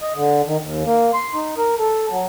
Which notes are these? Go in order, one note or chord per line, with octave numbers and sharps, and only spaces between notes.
D#5
D3
D#3
D#2
A#3
C6
D#4
A#4
A4
F#3